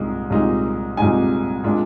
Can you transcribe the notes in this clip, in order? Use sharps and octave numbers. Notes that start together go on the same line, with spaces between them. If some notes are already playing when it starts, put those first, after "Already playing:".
Already playing: C2 A#2 G#3 D#4
C2 A#2 G#3 D#4
C2 A#2 G#3 D#4 G#5
A#2 G#3 D4 F4